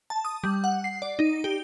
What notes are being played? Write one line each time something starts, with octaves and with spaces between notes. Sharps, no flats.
A5
D#6
G3
F#5
C7
D5
D#4
G4